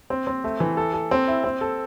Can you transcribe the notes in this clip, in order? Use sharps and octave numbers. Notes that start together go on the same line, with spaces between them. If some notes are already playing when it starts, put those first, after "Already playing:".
C4
C4
A3
E3
A4
A4
C4
E4
C4
A4